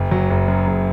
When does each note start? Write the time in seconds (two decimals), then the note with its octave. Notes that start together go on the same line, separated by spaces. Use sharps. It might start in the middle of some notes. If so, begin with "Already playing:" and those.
Already playing: F#1
0.11 F#3
0.30 F#1
0.48 F#2
0.67 F#1